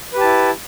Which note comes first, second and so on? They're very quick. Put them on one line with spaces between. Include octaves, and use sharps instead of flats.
B4 G4 A5 E4